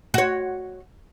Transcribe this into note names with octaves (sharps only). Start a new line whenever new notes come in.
F#4 C#5